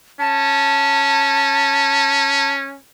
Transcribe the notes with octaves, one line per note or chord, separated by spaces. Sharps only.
C#4 A5